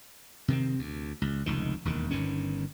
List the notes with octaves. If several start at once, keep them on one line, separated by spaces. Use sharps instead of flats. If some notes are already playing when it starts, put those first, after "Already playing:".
C3 D#3 C4
D2
C#2
F1 C#2 D#3
E1 D#2 D#3
G1 G2 D#3 C#4